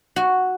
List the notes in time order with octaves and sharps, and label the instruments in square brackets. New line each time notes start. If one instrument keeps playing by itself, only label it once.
[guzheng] F#4